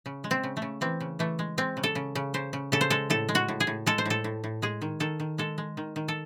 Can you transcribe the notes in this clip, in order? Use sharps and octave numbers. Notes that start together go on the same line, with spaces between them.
C#3
G#3
C4
C#3
A3
C#3
E3 C4
C#3
E3 A3
G#3
G#3 C4
C#3
A4
C#3
C#3
C#3 C5
C#3
C#3 A4
C5
G#3 A4
A2 A4
G#3
F#4
A2
G#4
A2
G#3 A4
C5
A2 A4
A2
A2
G#3 G#4
D#3
D#3 A4
D#3
G#3 A4
G#3
D#3
D#3
A4